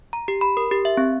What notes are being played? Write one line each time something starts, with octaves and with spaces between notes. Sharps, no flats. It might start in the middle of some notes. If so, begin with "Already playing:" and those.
A#5
G4
B5
A#4
G4
E5
C4